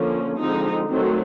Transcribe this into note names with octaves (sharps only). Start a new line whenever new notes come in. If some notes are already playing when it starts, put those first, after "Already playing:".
Already playing: D3 F3 A#3 C#4
D3 F3 G#3 C4 D#4
D#3 F#3 A3 C4